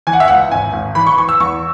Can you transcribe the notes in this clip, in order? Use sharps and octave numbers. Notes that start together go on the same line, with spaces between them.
E3 G#5
F#5
E5
C#2 F#5
G#1 G#5
G#1
E3 B5
C#6
E3 C#6
E6
E2 C#6